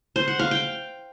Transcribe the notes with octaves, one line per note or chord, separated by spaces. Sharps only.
C5
F#5
F5
G5